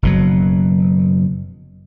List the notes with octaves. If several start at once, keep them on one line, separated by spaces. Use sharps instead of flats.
F#1 B2 F#3